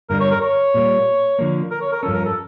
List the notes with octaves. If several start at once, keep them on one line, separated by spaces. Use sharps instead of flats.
G2 D3 G3 D4 A#4
C#5
A#4
C#5
A#2 G3 A#3
D3 F3 A#3
A#4
C#5
A#4
G2 F3 C#4 A4
A#4
A4